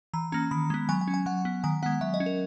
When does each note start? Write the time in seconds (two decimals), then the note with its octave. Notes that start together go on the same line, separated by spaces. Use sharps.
0.14 E3 A#5
0.32 A#3 C#4 A#5
0.51 D#3 B5
0.70 G#3 B3
0.89 F#3 G#5
1.01 G#5
1.08 C#4
1.14 G#5
1.26 F#3 F#5
1.45 B3
1.64 D#3 G#5
1.83 G#3 B3 F#5
2.01 F#3 E5
2.14 D#5
2.20 C#4
2.26 A#4